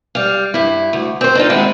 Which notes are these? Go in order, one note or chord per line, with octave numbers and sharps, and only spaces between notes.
G3 F5
G2 E4
D2
C4 C5
D4 D#4 F4
D#2 G#3 B3 C4 E4